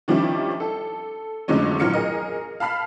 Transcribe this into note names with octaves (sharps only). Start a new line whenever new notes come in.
D#3 F3 G3 C#4 D4 E4
A4
F2 D3 F#3 G#3 A3 C#4
A#1 E3 F#3 F4 C#7
G#4 A#4 D#5
F5 A5 B5 F6 C7